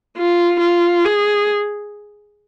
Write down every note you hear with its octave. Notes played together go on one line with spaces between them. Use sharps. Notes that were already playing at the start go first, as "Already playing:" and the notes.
F4
F4
G#4